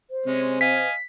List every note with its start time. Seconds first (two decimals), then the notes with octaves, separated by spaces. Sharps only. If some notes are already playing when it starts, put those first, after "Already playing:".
0.11 C5
0.26 C3 G#3 C#4
0.61 D#5 F5 G#5 B6